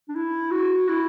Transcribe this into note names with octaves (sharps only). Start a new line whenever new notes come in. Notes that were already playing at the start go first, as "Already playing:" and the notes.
D4
E4
F#4
E4